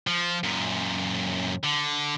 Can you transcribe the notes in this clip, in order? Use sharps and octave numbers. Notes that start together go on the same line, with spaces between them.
F3
F#2 A#2
D3